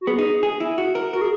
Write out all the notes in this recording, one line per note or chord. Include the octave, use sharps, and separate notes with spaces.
F#4
B3 G#4
D#4
G#4
E4
F#4
A#4
F#4 A#4
G#4